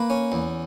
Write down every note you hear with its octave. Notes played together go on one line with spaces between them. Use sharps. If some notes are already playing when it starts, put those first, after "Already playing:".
Already playing: A#3 B4
C#4
E2